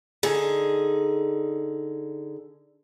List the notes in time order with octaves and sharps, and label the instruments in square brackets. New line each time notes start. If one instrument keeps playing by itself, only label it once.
[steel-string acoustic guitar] D3 D#4 G#4